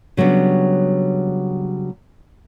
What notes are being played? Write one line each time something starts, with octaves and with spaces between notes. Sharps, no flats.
C#3 F#3 G3 B3 D4